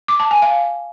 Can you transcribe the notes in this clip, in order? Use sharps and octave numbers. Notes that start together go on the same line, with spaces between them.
D6
A5
G#5
F5